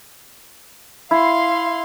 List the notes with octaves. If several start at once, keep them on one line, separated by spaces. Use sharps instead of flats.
E4 F5 C6